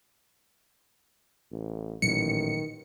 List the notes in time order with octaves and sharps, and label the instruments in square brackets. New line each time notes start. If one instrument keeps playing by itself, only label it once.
[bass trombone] A1
[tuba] A1 [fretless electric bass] A#2 F#3 [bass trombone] D#3 [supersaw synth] C#7